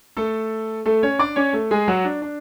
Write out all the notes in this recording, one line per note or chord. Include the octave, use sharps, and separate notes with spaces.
A3 A4
A3 A4
C#4 C#5
D4 D5
C#4 C#5
A3 A4
G#3 G#4
F#3 F#4
D4
D4